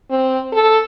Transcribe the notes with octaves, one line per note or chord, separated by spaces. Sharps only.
C4
A4